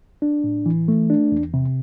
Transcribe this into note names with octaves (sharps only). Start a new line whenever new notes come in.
D4
A2
E3
A3
D4
E2
C3